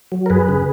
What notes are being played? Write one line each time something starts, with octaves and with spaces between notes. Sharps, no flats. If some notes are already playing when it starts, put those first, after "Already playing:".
F#3
A#4
F#2 G#4 B4
C#3